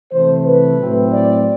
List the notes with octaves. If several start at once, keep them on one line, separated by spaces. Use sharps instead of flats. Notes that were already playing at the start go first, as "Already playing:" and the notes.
C3 E3 A3 C5
B4
A2 F#3 C4 E4
D5